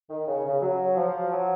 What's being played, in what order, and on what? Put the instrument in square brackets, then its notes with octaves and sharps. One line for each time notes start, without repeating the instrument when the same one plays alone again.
[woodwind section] D#3
C#3
C#3
F#3
F3
F#3